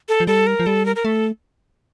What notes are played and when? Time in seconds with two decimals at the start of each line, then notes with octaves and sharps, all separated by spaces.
0.09 A4
0.20 F3
0.27 G3 A4
0.47 A#4
0.60 F3
0.66 G3 A4
0.86 A#4
0.96 A#4
1.05 A3 A4